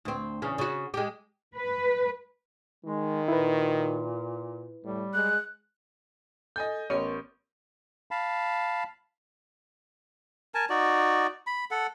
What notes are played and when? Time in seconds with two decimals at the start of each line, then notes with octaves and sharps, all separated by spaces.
0.05 D2 C4
0.42 E2 C#3 C#4
0.58 C#3 F#4
0.94 G#3 G4
1.56 B4
2.85 D#3 G#3
3.28 A#2 E4 B4
4.84 A2 G3
5.14 G#3 F#6
6.56 A4 D#5 G#5 G6
6.90 A1 B3 A#4 C#5 C6
8.11 F5 A5 B5
10.54 A#4 G#5 A5
10.69 D#4 F#4 D5
11.47 B5
11.71 A4 F#5